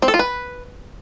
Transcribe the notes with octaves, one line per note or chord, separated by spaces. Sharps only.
C4
A4
F4
B4